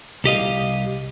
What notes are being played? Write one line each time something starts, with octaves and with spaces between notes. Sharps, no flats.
C2 G4 D#5 F5